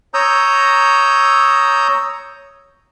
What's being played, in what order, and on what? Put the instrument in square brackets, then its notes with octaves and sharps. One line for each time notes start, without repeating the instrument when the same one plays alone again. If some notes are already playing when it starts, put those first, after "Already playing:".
[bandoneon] C#5 A#5 D#6 E6 G6